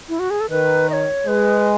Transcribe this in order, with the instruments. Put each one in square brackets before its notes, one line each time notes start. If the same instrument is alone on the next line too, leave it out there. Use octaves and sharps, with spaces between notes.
[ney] E4
F#4
G#4
A4
[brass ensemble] D#3 [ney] B4
[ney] D#5
C#5
[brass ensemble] G#3 [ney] B4